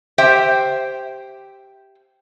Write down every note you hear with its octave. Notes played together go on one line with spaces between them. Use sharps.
G4 C5 E5 G5